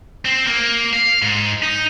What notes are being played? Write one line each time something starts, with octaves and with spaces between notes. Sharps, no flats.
C4
A#3
F5
G#2
D#4